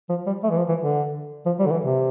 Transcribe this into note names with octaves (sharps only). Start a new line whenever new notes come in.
F3
G3
A3
E3
F3
E3
D3
F3
G3
D3
E3
C3